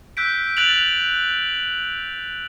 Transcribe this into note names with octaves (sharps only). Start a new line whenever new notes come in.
E6 F#6 G6 B6 D7
F#6 A6 D7 F7 F#7